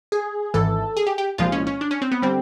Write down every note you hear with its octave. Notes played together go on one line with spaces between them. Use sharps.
G#4
G#1 G#2 E3 A4
G#4
G4
G4
C2 A#2 F3 G#3 F4
C#4
C#4
D4
C#4
C4
B3
D3 G3 C4